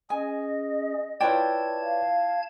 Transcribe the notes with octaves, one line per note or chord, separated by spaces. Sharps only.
C#4 G#4 D#5 G#5
E4 F4 B4 C#5 D5 G5 A5 G#6
F5